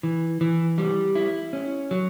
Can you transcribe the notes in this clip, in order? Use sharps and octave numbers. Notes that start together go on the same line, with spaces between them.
E3
E3
G3
E4
C#4
F#3